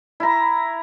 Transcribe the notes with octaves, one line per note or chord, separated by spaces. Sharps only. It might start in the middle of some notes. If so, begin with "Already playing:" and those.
E4 A#5